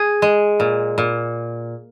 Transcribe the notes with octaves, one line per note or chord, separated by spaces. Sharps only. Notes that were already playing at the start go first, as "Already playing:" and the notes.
Already playing: G#4
G#3
A#2
A#2